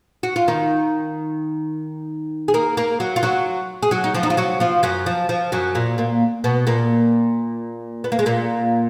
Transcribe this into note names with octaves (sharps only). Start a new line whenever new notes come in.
F#4
F4
D#3 D#4
G#4
A#3 A#4
A#3 A#4
F#3 F#4
F4
F#3 F#4
G#4
F#3 F#4
D#4
F3 F4
D#4
F4
F#3 F#4
F3 F4
F#2 F#3
F3
F3
F#2 F#3
A#2 A#3
A#2 A#3
B2 B3
A#2 A#3
B3
A#3
G#3
A#2 A#3